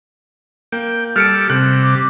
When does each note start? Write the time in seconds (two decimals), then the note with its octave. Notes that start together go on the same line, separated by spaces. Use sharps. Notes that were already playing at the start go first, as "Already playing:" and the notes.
0.72 A#3 G5
1.16 G3 A4 F6 C#7 D7
1.50 C3 G3 F#6
1.82 D6